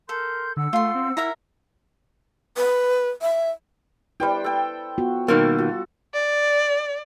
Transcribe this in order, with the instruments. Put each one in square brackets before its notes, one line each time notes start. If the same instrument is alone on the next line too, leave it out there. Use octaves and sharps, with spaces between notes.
[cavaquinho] A4 [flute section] A#4 C6 G6
[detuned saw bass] D3 [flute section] F#5 E6
[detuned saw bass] A3 [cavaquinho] F4 C6
[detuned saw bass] C4
[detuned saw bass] E4 [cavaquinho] A#4 E5 A#5
[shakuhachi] B4
E5
[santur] G3 C5 G5 [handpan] E4 B4 D5
[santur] A4 G5
[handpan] B3 F4 F#4
[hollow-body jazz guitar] B2 D#3 A#3 [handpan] G3 [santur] A4 C6
[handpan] F4 [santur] F#4
[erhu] D5